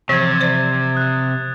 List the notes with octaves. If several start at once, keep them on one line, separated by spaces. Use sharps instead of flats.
C3 E3 F3 G#6 A6
C5 D5
D#6 F#6